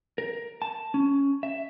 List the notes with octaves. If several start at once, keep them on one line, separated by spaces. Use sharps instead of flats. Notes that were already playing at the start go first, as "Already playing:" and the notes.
A#4
A5
C#4
E5